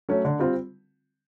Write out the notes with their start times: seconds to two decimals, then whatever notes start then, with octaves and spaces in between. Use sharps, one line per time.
0.09 F#3 A3 C#4
0.25 D3
0.39 G3 C4 F4